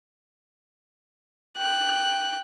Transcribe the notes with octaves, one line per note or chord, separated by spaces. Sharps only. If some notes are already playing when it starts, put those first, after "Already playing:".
G5 F#6